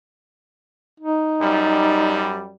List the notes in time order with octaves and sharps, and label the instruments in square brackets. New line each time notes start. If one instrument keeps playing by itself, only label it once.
[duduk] D#4
[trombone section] F#2 G3